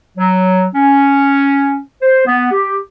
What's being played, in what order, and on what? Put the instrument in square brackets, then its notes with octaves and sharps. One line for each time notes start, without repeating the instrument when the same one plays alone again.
[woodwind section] F#3
C#4
C5
B3
G4